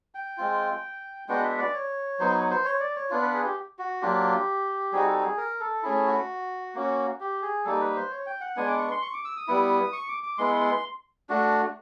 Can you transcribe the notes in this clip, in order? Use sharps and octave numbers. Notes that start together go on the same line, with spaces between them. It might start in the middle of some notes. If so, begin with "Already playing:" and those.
G5
G#3 C4 F4
G#3 B3 D4 F#4 G5
E5
D5
C#5
F#3 B3 D#4 C5
C#5
C5
C#5
D5
C#5
B3 D4 F4
B4
G#4
G4
F#4
F#3 A#3 D4 F4 G4
G3 C4 D#4 F#4 G#4
A4
G#4
A#4
A4
A3 C#4 E4 G#4
F#4
A#3 C#4 F#4
G4
G#4
G3 A#3 D#4 A4
B4
C5
C#5
G5
F#5
G#3 B3 D4 G#5
D6
C#6
C6
C#6
D6
E6
D#6
G3 B3 E4
C#6
D6
D6
G#3 B3 E4 C6
C6
A3 D4 F#4